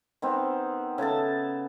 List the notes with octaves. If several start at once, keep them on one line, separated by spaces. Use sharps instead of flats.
D#3 B3 C4
C#3 A4 E5 A5